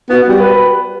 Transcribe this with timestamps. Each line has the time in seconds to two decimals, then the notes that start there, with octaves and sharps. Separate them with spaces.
0.10 B3 F#4
0.28 G3
0.39 B4